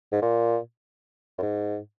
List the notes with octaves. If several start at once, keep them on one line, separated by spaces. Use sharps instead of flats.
G#2
A#2
F#2
G#2